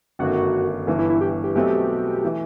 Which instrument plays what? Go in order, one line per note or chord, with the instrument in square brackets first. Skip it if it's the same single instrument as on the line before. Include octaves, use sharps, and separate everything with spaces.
[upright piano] G1 F#2 D#3 F#3 A3 [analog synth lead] F#4
[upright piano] G1 G2 E3
[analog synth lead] E4
E4
G4
G4
[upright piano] B1 B2 F#3 A3 C4 [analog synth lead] G4
[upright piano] E3 A3